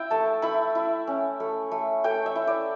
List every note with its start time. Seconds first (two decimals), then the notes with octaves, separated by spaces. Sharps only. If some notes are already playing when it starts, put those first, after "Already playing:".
Already playing: E4 E5 G5
0.10 A3 A5
0.42 E4 B5
0.75 E4
1.07 C#4
1.40 A3
1.71 A3
2.04 A3 G5
2.26 E5
2.36 E4
2.47 D5